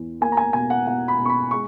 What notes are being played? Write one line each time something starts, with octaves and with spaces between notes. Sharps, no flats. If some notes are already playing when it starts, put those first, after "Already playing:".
Already playing: E2
A#3 G#5
A#5
G#5
B2 G#5
F#5
B2 F#5
B5
B2
C#6
B5
G#3 C#6